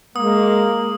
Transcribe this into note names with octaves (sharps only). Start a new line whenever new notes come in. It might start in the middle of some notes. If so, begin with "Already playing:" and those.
G#3 A#3 D#6